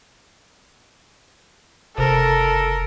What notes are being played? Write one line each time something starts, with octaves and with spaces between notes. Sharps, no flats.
F#1 C3 A4 A#4